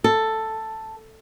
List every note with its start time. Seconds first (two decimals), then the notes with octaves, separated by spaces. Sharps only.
0.04 A4